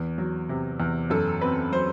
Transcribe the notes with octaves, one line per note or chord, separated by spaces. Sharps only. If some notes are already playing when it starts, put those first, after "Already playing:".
Already playing: E2
F#3
C3
E2
F#2 A4
C4 B4
F#3 C5